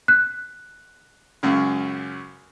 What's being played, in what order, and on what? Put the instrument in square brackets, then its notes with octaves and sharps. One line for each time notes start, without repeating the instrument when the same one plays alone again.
[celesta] F#6
[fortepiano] C#2 F#2 C#3